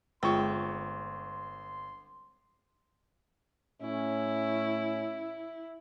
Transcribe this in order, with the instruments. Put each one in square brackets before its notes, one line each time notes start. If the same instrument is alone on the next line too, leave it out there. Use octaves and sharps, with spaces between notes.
[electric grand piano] G1 C#6 [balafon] G#3 F4 G#4 [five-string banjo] C4 [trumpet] C6
[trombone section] A2 C#4 [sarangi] E4